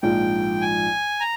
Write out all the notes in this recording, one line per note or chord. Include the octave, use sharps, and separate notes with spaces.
A#1 G#2 F3 G5
G#5
A#5